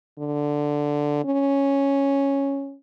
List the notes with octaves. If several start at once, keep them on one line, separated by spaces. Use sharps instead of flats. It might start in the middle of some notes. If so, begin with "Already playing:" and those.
D3
C#4